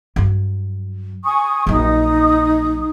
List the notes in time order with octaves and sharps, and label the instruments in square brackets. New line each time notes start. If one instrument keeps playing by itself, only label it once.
[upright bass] G2 F#3
[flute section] G#5 C#6 D#6
[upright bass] A#1 F#3 [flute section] D#4 D#6